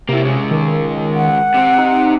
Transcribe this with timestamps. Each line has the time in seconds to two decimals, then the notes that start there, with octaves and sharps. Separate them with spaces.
0.09 C3 A#3 E4
0.24 C#3 G#3
0.51 D#3
1.14 F#5
1.54 C3 C4
1.78 D#4